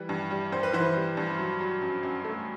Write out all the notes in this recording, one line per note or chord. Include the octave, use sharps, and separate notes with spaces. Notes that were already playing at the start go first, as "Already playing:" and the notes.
Already playing: E3 G3 B4
G2
G3
G2 C5
B4
E3 C5
G3
G2
F#3
F#3
F#2
F#2
A3